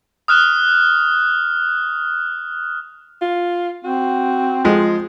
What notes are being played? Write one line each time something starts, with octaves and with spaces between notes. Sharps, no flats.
D#6 F6 F#6 E7
F4
C4 F#4
F3 G#3